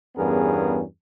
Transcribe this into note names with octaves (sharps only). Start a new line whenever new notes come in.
E2 G2 B3 C#4 G#4 A#4